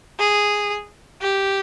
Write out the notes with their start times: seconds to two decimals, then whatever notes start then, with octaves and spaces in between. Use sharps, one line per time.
0.19 G#4
1.21 G4